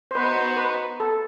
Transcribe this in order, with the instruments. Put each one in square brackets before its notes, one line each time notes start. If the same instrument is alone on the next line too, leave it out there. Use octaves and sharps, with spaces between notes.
[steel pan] C5
[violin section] B3 D#4 F#4 [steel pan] B4
[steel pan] C5
B4
A4